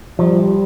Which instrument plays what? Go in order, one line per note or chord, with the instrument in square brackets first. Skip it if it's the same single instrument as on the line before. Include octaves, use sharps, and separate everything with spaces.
[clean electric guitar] F3 [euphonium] G3